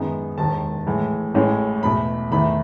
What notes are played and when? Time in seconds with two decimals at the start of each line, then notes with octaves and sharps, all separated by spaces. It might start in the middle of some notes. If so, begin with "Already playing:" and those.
Already playing: F#2 D#3 G#3 B3 D#4
0.38 E1 D#2 D#3 A5
0.87 A2 E3 G#3
1.34 A1 A2 G#3 C#4
1.83 E2 B2 A3 B5
2.31 E2 D#3 A3 B5